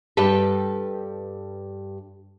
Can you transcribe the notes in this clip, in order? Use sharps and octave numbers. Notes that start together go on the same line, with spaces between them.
G2 G3 G4 A4 B4